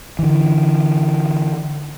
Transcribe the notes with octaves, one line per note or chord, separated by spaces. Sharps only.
D3 E3